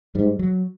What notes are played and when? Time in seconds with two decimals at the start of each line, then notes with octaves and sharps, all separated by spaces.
0.15 G#2 G3
0.39 F#3